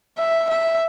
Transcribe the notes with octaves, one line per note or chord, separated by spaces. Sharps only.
E5
E5